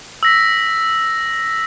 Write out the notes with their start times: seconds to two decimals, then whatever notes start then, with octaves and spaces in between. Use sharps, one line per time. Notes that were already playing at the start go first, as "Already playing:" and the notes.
0.23 E6 A#6 B6